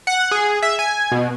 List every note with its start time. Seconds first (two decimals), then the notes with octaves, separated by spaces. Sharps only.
0.07 F#5
0.31 G#4
0.62 E5
0.79 G#5
1.12 B2